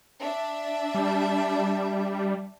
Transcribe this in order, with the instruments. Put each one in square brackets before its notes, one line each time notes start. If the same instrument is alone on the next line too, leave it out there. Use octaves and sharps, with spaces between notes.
[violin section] D4 E5
[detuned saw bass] G3